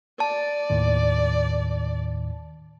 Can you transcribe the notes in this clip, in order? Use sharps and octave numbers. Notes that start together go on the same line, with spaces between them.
D5 A5
D#2 A2 D#3